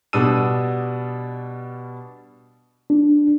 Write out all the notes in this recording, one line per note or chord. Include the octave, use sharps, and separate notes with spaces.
B2 G3 D4 D#6 E6 D#7
D4